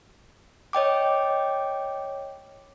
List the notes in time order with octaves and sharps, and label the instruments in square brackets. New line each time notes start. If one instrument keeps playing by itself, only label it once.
[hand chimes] C#5 D#5 G5 D6